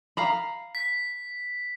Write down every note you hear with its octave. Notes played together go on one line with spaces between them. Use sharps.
F5 A#5 B5
B6